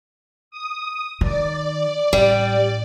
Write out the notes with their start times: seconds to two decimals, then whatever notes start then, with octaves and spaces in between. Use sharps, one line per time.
0.51 D#6
1.21 D#3 D5
2.13 A1 G3